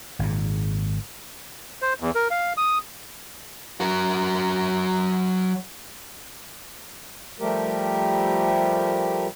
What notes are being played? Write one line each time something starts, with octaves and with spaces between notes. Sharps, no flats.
G#1 A#2
C5
E2
A#4
F5
D#6
F#3 A#4
F3 G3 A3 G4 A#4